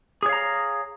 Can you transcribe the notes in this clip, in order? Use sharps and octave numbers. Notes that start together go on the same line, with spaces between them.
G#4 C#5 F5 A#5